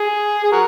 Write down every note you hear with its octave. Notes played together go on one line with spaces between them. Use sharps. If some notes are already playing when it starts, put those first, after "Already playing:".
Already playing: G#4
G#4
F#4 A#4